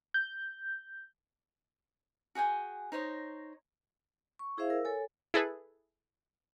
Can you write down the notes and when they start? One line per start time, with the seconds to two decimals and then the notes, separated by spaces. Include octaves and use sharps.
0.14 G6
2.35 F#4 G#4 G5 G#5
2.92 D#4 C5 C#5 D#5
4.39 C#6
4.58 E4 G#4 C5 E5 F5
4.70 A#4 E6
4.85 A4 C#5 G#5
5.34 E4 G#4 A4 B4